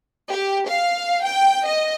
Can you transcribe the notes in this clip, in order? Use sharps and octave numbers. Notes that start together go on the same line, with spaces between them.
G4
F5
G5
D#5